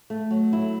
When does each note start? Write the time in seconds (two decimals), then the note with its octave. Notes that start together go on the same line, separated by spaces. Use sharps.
0.10 A3
0.31 F#3
0.53 E4